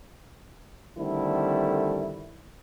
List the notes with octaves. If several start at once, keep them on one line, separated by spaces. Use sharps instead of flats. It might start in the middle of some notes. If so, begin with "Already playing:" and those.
D3 D#3 G3 A3 C4 E4